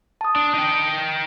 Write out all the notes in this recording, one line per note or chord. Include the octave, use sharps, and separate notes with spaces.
A5 D#6
D4
D#4 G5